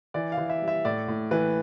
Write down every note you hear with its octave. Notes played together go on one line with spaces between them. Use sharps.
E3 D5
F5
E3
E5
G3
E5
A2 D5
A2
E3 B4